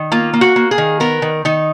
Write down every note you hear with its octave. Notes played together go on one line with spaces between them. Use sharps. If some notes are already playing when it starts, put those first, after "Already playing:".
Already playing: D#3
A#3 F4
A#3
F#4
A#3
G#4
D#3
B3 A#4
D#3
D#3 D#4